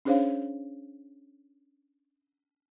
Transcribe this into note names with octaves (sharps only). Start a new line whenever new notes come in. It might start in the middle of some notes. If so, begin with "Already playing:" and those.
C#4 D4 G#4 C5 C#5 F5